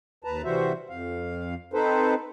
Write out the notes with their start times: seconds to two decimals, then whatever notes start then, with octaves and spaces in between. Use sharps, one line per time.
0.24 D#2 B4 A5 A#5
0.45 C3 E3 G3 F#4 C5 E5
0.90 F2 F5
1.74 C4 D#4 A4 B4 C5